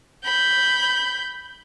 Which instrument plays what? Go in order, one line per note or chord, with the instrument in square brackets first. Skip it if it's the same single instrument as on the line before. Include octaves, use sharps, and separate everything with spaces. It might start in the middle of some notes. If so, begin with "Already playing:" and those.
[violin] B5 G6